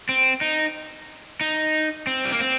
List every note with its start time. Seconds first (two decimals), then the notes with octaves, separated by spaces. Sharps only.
0.09 C4
0.41 D#4
1.41 D#4
2.07 C4
2.25 G3
2.32 A#3
2.40 C4